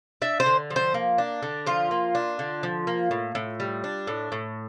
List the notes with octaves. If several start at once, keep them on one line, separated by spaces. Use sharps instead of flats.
D4 E5
C5
D3
F3
C5
A#3
D4
D3
F3 F4
A#3
D4
D3
F3
A#3
A2
A2
G3
D4
A2
A2